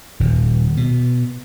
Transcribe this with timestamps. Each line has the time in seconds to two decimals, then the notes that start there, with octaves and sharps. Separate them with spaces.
0.20 D#1
0.77 B2